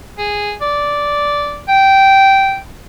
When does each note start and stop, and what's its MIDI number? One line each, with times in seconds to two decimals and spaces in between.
0.18 0.53 68
0.61 1.60 74
1.68 2.57 79